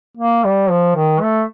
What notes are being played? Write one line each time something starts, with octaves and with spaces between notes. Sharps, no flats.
A#3
G3
F3
D#3
A3